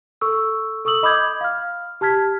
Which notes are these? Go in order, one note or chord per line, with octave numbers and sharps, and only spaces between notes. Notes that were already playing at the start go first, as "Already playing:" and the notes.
A4 C#6 E6
A4 C#6 D#6 E6 F#7
D#5 B5 D6 D#6 G6 G#6
F5 F6
G4 A5 F6 G#6 B6